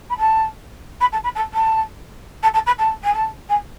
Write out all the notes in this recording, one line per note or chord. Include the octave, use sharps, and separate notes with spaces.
B5
A5
B5
A5
B5
A5
A5
A5
A5
B5
A5
G#5
A5
G#5